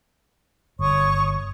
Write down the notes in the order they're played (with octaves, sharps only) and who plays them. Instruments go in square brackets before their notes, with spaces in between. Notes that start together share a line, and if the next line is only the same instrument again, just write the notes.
[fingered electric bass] G1 [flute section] C#5 C#6 D#6